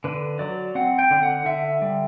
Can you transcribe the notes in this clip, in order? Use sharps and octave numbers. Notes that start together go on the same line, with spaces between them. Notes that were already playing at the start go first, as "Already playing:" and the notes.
D3 B4
F#3 D5
C4 F#5
G5
D3
F#5
D3 E5
G3